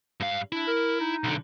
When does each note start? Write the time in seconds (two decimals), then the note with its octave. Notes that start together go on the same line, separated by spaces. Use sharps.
0.20 G2 F5
0.52 D4 E4
0.67 A#4
1.00 D#4
1.24 B1 D3